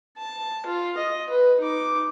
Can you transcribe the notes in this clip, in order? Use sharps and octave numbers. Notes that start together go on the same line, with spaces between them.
A5
F4
D#5
B4
D#4 D6